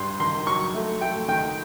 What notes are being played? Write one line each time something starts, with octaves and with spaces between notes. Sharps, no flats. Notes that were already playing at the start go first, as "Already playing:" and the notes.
Already playing: G2 C6
D#3 C6
F#3 C#6
A3
A3 G5
D#3 G5